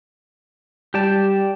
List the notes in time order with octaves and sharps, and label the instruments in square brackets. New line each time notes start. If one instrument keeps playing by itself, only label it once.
[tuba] G3 [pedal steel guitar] G4 D5 A5